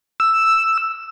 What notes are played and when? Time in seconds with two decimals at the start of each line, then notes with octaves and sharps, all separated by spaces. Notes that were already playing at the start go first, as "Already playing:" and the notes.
0.20 E6